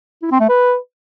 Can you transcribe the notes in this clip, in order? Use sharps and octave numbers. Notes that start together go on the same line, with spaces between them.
E4
C4
A3
B4